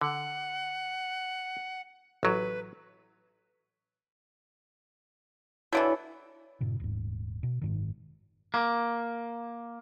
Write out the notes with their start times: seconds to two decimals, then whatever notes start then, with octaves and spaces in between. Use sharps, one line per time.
0.01 D3 F#5
2.23 A1 F#3 B4
5.73 B2 D3 E3 E4 C#5
6.61 G2 A#2 C#3
6.80 D#1 G#2
7.43 B2
7.61 F#1 G#2 D#3
8.54 A#3